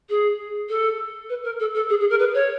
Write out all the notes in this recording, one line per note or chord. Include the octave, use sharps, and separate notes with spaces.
G#4
A4
B4
A#4
A4
A4
G#4
G#4
A#4
B4
C#5